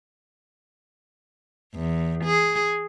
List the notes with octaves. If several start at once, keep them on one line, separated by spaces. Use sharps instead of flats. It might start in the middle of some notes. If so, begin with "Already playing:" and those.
E2
G#4